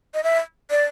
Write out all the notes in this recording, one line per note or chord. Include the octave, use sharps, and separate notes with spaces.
D#5
E5
D5